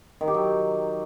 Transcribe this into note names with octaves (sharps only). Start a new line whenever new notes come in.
D#3
G4
F#3